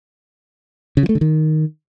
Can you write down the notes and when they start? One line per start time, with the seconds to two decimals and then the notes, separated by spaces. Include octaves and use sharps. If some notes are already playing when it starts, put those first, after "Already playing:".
0.97 C#3
1.03 F3
1.09 A3
1.15 D3
1.21 D#3